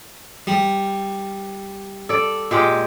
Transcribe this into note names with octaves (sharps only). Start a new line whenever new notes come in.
G3
A4 D5
A#2 G#3 G4